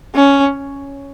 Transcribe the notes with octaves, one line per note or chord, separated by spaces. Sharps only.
C#4